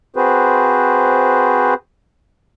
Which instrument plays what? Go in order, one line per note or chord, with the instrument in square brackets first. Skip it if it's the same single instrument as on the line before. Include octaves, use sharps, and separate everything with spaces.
[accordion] C4 F#4 G#4 B4 C5